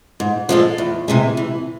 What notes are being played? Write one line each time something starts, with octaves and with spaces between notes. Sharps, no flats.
G#2
F3 G#3 D4 A4
E2
C3 E3 G#3
E3